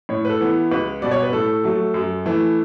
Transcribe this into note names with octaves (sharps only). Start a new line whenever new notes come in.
A2 C#5
B4
A4
E3 B3
C#2 B4
B2 G3 B3 D5
C#5
B4
A2 A4
F#3 A3
F#2
E3 A3